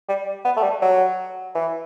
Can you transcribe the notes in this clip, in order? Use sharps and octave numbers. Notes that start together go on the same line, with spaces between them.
G3
B3
A3
G3
F#3
E3